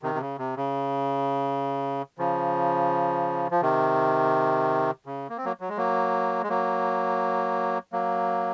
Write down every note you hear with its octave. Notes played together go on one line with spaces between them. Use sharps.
C3 D#3
C3
C#3
C3
C#3
C#3 F3
F3
C3 D#3
C#3
A#3
C4
F#3 A#3
F#3
G#3
F#3 A#3
G#3
F#3 A#3
F#3 A#3